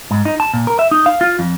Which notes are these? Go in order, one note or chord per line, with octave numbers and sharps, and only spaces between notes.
G#2
D#4
A5
A#2
A#4
E5
D#4
F5
F4
F2